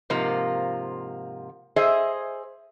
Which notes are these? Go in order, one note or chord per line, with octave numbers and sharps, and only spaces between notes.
G#2 C3 F3 A#3 F4
G#4 C5 D#5 E5